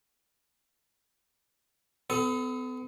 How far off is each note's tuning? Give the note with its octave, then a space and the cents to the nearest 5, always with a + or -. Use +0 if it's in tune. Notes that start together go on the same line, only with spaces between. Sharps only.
B3 +40 A4 -15